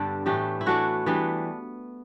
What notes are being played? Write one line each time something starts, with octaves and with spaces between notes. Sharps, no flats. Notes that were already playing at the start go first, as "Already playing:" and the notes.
Already playing: G2 D3 G3 B3 D4 G4 A4
A2 E3 A3 D4 G4
E4
E3 A3 D4 F#4
E3 G3 B3 D4